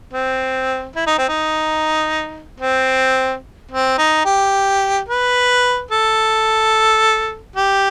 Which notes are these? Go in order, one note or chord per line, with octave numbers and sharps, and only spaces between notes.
C4
E4
D#4
C4
D#4
C4
C4
D#4
G4
B4
A4
G4